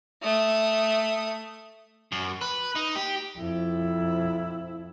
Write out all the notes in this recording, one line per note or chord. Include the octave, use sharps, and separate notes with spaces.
A3 D#6
F#2
B4
D#4
G4
F2 E4